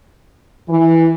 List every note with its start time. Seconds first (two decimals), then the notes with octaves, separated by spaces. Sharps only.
0.68 E3